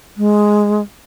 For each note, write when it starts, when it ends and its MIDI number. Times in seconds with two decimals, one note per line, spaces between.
0.17 0.82 56